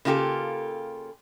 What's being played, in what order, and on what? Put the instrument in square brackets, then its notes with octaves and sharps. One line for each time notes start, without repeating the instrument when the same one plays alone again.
[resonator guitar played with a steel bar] C#3 A#3 F4 G4 A4